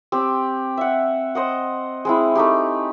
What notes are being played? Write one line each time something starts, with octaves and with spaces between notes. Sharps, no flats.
C4 G4
E5 F#5
C5 D#5 F#5
G#3 C4 E4
A3 D#4 G4